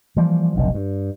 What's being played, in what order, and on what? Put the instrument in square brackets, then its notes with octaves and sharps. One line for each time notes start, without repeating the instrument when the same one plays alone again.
[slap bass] E3 F3 G3 A#3
F1 B1 G2
G2